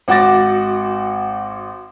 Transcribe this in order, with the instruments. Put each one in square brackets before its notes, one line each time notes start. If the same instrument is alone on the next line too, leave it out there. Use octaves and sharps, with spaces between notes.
[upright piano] G#1 F#4 F#5 D6 A6 A#6